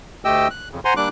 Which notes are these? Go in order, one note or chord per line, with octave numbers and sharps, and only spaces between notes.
D2 A3 G4 D#5 G5 E6
F#6
F2 C#3
C5 F#5 G#5 A#5 C6
G3 A#3 D4 D6 F#6